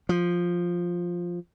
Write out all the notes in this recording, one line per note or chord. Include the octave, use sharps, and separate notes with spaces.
F3